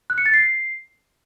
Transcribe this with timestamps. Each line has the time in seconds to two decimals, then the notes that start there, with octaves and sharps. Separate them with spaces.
0.10 F#6
0.18 C#7
0.26 A6
0.34 C7